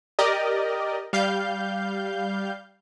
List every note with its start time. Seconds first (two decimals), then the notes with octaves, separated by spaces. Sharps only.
0.19 G4 A#4 D5 D#5
1.13 G3 F5 G6